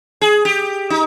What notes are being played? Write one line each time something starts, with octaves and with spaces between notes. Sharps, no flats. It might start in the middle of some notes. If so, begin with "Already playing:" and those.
G#4
G4
D#4